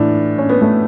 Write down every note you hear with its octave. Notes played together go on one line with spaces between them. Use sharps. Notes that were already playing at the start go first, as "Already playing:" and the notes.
Already playing: A2 E3 D4
C#4
B3
A3